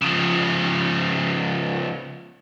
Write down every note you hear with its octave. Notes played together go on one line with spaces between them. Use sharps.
C#3 F3